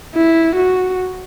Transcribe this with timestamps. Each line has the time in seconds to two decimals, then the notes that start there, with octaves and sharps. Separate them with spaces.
0.15 E4
0.56 F#4